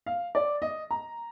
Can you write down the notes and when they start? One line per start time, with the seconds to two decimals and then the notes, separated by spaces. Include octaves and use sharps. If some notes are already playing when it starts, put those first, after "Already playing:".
0.06 F5
0.35 D5
0.62 D#5
0.91 A#5